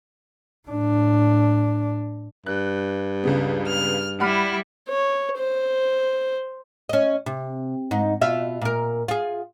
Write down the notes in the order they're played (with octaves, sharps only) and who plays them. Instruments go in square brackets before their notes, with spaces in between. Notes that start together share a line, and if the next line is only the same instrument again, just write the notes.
[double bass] A2 D4
[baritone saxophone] G2 [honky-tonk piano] F#6
[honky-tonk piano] C#2 C#3 B3
[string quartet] F6
[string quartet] G3 E4 [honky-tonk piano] F#5 B5 F6
[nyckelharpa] C#5
C5
[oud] C#4 D#5
C3
G#2 D#4
B2 F4 E5
A#2 A#4
F4 G#4